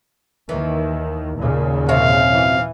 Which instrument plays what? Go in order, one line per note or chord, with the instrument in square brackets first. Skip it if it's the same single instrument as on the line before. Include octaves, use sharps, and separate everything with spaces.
[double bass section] D#2 D#3 [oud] E3
[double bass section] D#2 A#2 C#3
[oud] F#2 C3 C#5 [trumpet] F5
[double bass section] E3